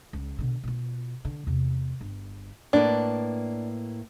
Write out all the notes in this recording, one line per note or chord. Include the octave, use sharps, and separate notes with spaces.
C#2
B2 D3
B2 F4
D3
E2 C3
G1
A2 A#3 D4 B4